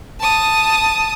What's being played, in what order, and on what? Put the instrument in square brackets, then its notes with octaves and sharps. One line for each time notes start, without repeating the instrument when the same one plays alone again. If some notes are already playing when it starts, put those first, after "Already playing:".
[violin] A5 D#6